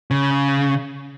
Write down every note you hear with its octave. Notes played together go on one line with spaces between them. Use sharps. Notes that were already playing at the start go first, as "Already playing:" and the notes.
C#3